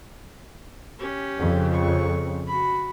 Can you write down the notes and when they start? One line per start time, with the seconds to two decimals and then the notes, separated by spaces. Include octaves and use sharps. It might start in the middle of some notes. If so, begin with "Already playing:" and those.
0.99 C#4 G4
1.39 F2 C#3
1.73 C#6
2.47 F#4 B5